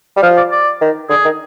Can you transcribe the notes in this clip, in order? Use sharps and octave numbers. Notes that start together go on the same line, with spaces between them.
G3
F3 F5
D5
D5
D#3
D3 G#4
D#3